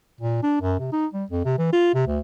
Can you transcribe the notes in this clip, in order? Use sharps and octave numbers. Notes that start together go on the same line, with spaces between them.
A#2
D4
F#2
C3
D#4
G3
F2
C3
E3
F4
C3
D2